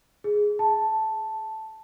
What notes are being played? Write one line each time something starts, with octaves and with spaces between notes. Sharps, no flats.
G#4
A5